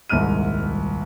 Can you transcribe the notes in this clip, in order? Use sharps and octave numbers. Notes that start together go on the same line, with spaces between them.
D#1 C2 G#2 E5 F6 D#7